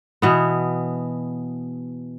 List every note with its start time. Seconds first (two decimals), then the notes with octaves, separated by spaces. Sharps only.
0.22 B2 E3 B3